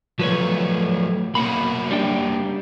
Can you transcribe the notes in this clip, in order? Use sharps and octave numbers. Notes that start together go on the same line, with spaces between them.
F3 F#3 A3 B4 C#5
B2 A#3 C#4 F#5 B5
G3 D4 G5